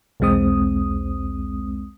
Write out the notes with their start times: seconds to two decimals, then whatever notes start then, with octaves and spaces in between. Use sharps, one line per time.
0.20 B1 E2 G#3 C4 D#6